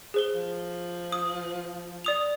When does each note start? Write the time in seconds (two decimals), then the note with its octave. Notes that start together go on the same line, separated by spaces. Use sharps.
0.14 G#4 C5 G7
0.34 F3
1.12 D#6
2.05 D5 D#6 F7